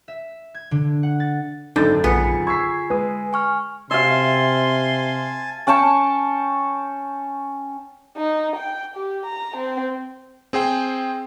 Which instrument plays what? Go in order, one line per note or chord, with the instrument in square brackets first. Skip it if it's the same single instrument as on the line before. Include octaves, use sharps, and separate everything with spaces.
[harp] E5
G#6
D3
F#5
A6
[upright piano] G#1 F#2 A6 [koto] D3 [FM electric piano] D#4 A5 G6
[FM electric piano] A#1 B5 C#7 [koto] B3 [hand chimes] F4 G#4 G#5
[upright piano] C#6 E6 B6 [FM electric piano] G#6 C7
[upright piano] G#3 [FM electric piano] B4 G#5 D#6
[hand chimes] G#5 C#6 F6
[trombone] C3 [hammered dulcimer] E5 F5 [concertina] G#5 A5 [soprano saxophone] C6
[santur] C#4 G5 A5 C#6
[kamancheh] D#4
G5
G4
A#5
C4
[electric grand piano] C4 G#4 C5 G5